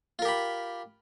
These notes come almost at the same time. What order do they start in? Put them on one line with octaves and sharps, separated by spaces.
F4 A#4 G4 B5